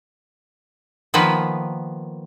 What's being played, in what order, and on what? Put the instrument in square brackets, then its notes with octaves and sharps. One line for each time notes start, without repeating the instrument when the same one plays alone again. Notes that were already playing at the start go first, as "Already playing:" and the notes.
[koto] D#3 F3 A#3 B3 B4